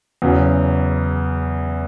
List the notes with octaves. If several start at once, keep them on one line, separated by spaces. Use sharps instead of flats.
E2 C#3 F#3